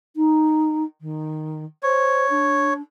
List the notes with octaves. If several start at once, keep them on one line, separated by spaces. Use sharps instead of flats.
D#4
D#3
C5 C#5
D4